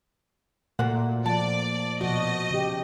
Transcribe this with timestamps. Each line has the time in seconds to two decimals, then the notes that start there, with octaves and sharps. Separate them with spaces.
0.79 A#2 A3 F#4 C5 F#5
1.26 F3 D5 A5
2.01 B2 F3 A3 F#4 D#5
2.51 C#3 G4